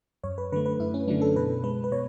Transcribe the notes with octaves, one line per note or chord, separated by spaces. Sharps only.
F#2 C#5
B4
D3 F#3 A3 B4
B4
F#2 E4
C#4
D3 F#3 A3 D4
A4
B2 B4
G#3 B4
B4
B2 C#5